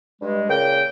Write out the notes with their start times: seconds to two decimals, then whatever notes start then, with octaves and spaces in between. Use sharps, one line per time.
0.21 G2 G#3
0.49 A#2 C#3 A#3 G5